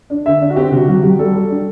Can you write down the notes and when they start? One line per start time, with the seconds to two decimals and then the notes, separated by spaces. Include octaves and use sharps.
0.10 D4
0.26 D3 E5
0.41 D4
0.50 F#4
0.56 C4 G4
0.72 C3 F#4
0.87 F#3 F#4
1.03 F#3 G4
1.19 G3 A4
1.34 G3
1.50 D4